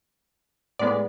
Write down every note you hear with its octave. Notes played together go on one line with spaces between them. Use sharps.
A2 G#3 B3 D5